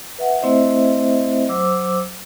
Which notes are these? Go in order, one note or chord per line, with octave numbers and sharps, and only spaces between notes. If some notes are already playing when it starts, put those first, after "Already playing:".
B4 E5 F#5
A3 C4 E4 C5 D#5 E5
F#3 C5 D6 E6